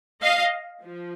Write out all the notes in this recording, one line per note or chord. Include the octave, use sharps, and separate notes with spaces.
D#5 F5
F3